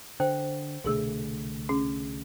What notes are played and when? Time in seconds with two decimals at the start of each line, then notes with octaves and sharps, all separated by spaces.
0.20 D3 C5 G5
0.84 C2 B2 D3 A3 G#4 E6
1.69 C#4 G#4